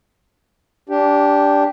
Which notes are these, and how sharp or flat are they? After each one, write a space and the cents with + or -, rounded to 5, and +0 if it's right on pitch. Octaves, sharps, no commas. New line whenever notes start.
D4 -15 G4 +0